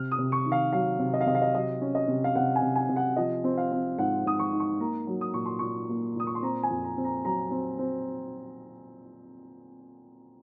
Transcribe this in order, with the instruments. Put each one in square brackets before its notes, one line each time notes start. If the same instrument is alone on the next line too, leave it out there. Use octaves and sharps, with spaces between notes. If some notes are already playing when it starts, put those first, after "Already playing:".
Already playing: [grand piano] C3 F6
D#6
C3
C#6
D#3
F5
F#3 F5
C3
D#5
F5
C3 D#5
F5
D#5
F#3 D#5
C#4
D#5
C3
F5
C3 F#5
G#5
C3
G#5
C3
F#5
F3 D#5
C4
F5
C4
G#2 F#5
G#2 D#6
C#6
D#4
C#6
A#3 A#5
F#3
D#6
A#2 C#6
C6
A#2 C#6
A#3
A#2 D#6
C#6
C6
C4 A#5
G#5
F2
A#5
C4
A#5
F#3 A#5
C4
C4